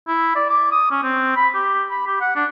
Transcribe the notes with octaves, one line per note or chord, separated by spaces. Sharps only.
E4
D5
D6
D#6
C#4
C4
B5
G4
B5
G4
F#5
D4